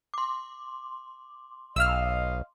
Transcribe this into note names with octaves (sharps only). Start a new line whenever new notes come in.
C6 D6
B1 D#5 F5 E6 F6